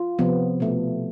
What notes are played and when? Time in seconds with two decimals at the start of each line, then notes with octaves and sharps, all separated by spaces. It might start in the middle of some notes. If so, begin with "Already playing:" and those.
Already playing: F4
0.19 C3 F3 B3
0.60 B2 A3